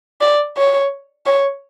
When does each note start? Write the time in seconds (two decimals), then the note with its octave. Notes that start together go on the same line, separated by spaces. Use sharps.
0.21 D5
0.57 C#5
1.26 C#5